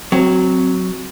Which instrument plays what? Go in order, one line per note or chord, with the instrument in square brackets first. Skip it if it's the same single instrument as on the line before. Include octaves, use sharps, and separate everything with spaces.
[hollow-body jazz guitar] F#3 [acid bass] C4